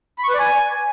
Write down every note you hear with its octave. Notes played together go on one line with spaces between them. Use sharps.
B5
C#6
B4
D5
G#5